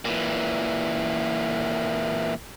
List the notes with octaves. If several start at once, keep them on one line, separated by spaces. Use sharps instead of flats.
A#2 E3